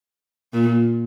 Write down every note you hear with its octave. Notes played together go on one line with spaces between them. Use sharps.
A#2